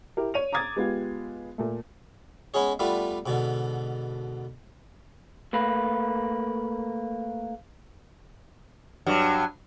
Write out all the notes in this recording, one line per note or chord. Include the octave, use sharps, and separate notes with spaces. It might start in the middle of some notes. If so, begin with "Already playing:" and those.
E4 G4 A#4
C#5 D#7 F7
A#5 D6 D#6 G#6 A6
G#3 B3 F4 G4
A#2 A3
G#3 B3 C#4 G#4 C#5
G3 A3 B3 D4 F4
G#2 B2 D3
A3 A#3 B4
G2 F#3